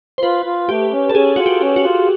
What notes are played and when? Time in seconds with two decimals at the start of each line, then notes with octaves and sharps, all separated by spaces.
0.18 C5
0.22 F4 B4
0.46 F4
0.69 A3 G4
0.92 C#4
1.09 A4
1.15 C#4 G#4
1.36 F4 F#4
1.46 G4
1.61 C#4
1.76 F#4
1.84 F4